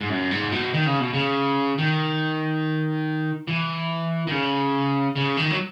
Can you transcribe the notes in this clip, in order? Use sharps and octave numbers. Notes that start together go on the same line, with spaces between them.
G#2
F#2
G#2
B2
D#3
C#3
B2
C#3
D#3
E3
D#3
C#3
C#3
D#3
F#3